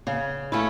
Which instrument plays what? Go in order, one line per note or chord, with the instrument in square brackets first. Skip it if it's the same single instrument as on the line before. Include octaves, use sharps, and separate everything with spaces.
[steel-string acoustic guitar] C#3
A3 C#4 E4